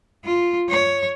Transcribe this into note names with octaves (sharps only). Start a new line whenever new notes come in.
F4
C#5